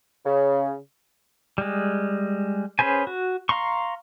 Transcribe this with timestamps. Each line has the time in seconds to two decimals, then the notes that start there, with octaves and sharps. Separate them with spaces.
0.25 C#3
1.58 G3 G#3
2.79 C#4 G#4 B4 C5 G#5
3.07 F#4
3.49 F5 A#5 C6 C#6